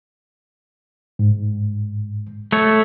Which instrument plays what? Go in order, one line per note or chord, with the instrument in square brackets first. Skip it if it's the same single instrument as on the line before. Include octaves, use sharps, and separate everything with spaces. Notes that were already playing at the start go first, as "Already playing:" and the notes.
[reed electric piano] G#2
[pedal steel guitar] A3 C#5